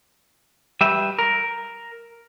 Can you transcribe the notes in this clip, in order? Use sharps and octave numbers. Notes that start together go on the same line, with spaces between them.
G3 G4 B4 E5
A#4